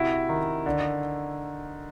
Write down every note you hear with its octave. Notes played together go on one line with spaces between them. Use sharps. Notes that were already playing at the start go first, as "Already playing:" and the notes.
Already playing: C3 E4 F#4
D#3
D3